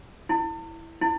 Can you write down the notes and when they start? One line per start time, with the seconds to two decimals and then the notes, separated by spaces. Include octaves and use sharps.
0.29 E4
1.01 E4